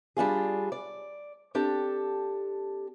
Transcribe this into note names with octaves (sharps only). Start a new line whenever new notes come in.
G3 D4 F4 G#4
D5
C4 D4 G4 A4